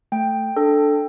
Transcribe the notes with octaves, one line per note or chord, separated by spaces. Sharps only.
A3 G5
D4 A4